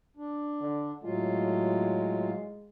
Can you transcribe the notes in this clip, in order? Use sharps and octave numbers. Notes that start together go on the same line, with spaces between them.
D4
D3
A2 F#3 G#3 F4